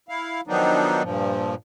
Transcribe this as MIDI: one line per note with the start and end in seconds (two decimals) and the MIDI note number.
0.09 0.41 64
0.09 0.41 77
0.47 1.02 51
0.47 1.02 53
0.47 1.02 54
0.47 1.02 59
0.47 1.02 62
0.47 1.02 63
1.02 1.55 43
1.02 1.55 46
1.02 1.55 53